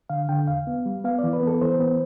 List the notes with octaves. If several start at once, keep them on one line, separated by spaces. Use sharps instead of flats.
D3 F5
D3 G5
E2 F5
B3
G3
B3 F5
E3 D5
B4
B3 A4
E3 C5
B3